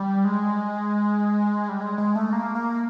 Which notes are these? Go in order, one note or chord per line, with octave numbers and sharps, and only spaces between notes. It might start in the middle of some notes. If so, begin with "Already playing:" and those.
Already playing: G3
G#3
G3
G#3
G#3
A3
A#3
A#3